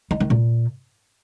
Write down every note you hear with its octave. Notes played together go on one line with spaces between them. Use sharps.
D#4
D#3
A#2